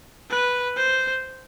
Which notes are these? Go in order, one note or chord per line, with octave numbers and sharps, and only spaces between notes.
B4
C5